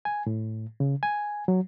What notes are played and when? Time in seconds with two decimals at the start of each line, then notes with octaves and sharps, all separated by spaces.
0.05 G#5
0.27 A2
0.80 C#3
1.03 G#5
1.48 F#3